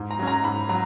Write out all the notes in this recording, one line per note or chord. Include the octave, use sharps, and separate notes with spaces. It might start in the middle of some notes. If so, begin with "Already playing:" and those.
Already playing: G#2
A#5
F#3 C#4
A#5
G#2 B5
F#3 A#5